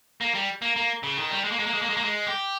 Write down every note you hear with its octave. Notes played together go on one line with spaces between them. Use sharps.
A#3
G3
A#3
A#3
C#3
D#3
G3
G#3
A#3
G#3
A#3
G#3
A#3
G#3
A#3
G#3
G4